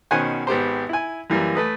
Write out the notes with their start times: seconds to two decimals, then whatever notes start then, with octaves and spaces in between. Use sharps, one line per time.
0.11 B2 D#3 C#4 C5 F#5 G#5
0.47 G#1 B3 G4 C5
0.89 E4 G#5
1.30 F#2 E3 G3 A#3
1.55 A3 B4 D#6